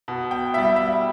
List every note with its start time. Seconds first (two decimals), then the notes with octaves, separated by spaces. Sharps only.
0.08 B2
0.31 G5
0.53 G3 E4 E5
0.76 E5